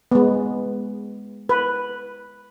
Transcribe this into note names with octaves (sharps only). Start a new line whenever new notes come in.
G#3 B3
B4